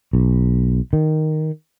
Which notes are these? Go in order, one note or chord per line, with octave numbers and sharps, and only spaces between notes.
B1
D#3